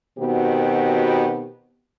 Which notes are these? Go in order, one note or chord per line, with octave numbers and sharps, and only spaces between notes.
B2 D#3 B3 C4 F#4 G4